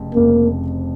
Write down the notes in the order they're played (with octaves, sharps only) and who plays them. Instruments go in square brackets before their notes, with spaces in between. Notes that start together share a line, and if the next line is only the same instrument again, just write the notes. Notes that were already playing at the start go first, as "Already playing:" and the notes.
Already playing: [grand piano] F1 F2 C#3
[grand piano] F1 F2 C#3 [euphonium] A#3